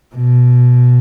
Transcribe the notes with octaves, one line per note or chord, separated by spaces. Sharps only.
B2